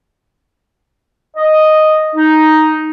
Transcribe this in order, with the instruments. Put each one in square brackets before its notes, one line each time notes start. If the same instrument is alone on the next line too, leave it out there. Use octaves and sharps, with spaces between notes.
[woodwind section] D#5
D#4